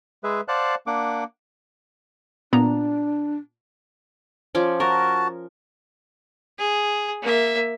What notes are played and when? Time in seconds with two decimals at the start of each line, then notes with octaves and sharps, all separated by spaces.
0.24 G#3 G#4 B4 E5
0.48 C5 D5 F5 F#5 A5 F#6
0.87 A#3 D4 F#5 D6
2.53 A#2 B3 D4 A#5
4.55 F3 C#4 D5
4.80 F#4 A#4 A5
6.59 G#4
7.22 A#3 E5